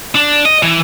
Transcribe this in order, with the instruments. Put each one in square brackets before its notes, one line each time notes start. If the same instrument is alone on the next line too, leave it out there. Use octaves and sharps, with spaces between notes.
[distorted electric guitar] D4
D#5
E3